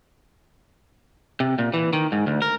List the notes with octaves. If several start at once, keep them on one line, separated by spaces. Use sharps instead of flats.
C3
A#2
E3
D#3
G#2
D2
A#4